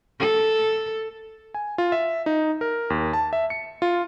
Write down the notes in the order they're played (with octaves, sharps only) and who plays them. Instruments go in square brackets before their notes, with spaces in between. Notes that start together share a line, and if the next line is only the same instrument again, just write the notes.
[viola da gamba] A4
[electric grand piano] G#5
F4
E5
D#4
A#4
D#2
A5
E5
C#7
F4